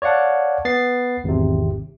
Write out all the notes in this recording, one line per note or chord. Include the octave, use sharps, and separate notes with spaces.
C#5 D5 F5 F#5 A5
B3 A6 C7
G#1 E2 C3